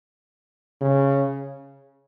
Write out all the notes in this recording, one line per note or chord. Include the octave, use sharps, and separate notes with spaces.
C#3